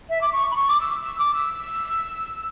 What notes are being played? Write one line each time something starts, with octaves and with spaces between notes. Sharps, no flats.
E5
D6
C#6
B5
C#6
D6
E6
E6
D6
E6